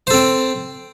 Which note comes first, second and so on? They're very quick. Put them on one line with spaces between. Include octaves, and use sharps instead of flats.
C5 A4 C4